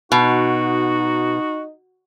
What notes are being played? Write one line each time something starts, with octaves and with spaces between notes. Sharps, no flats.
B2 D#4 F#4